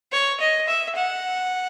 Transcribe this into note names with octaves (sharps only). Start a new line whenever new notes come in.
C#5
D#5
E5
F#5